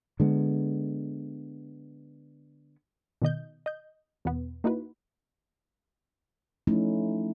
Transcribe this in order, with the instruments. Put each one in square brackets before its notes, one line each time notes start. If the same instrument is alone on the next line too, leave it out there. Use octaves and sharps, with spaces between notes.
[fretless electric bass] D3 G#3 B3
[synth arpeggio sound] B2 D#3 D#5 G6
D#5 G6
E2 B2 B3
A#3 D#4 E4 F#4 B4
[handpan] F3 A3 C#4 D#4 E4